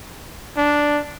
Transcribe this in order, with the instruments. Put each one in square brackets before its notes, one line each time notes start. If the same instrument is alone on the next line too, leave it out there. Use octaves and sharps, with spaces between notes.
[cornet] D4